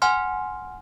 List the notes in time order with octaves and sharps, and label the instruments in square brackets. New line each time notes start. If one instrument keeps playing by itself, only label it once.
[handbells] F#5 G#5 C6 F6